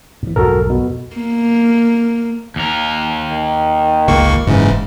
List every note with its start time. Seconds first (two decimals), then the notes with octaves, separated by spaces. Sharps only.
0.23 G2 E3
0.36 B1 F2 G#2 F#4 A4 A#4
0.70 B2
1.16 A#3
2.56 D#2 A#4
3.31 D#3
4.08 G1 C#2 A#3 C#6
4.47 F#1 G#2 C#3 E3